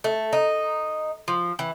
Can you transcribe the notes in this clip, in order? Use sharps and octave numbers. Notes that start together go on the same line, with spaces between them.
A3
D#4
F3
E3